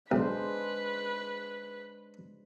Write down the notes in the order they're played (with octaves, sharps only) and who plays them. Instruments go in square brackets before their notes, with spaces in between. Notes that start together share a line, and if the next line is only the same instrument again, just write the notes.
[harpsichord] B1 [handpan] G#3 D4 C5 [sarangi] B4